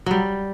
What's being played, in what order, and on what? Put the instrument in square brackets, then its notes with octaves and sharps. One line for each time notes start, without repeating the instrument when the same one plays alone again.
[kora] F#3 G3